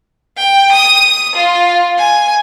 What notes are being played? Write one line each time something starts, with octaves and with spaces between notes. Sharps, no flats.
G5
D#6
F4
G#5